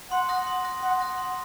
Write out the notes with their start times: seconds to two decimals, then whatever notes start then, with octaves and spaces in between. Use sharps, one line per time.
0.11 F#5 C6
0.29 D#6 F#6 A#6
0.47 C6
0.65 D#6 F#6 A#6
0.82 F#5 C6
1.00 D#6 F#6 A#6
1.18 C6